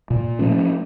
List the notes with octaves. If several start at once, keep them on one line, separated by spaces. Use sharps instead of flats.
A#2
F3 A3 C#4